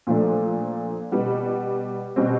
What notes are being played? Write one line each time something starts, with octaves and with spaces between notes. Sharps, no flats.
A#2 F3 A3 D4
B2 G3 B3
B2 G3 C4